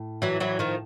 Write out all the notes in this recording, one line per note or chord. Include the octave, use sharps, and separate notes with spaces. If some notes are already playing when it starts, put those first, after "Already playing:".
Already playing: A2
E3 F#3
E3 F#3
D#3 F3